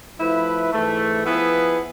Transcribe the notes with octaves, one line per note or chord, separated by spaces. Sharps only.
F3 A3 E4 B4
G#2 E3 A3
F3 B3 E4 G#4 B4